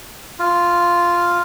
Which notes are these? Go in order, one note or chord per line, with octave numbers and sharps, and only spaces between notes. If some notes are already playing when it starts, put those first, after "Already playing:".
F4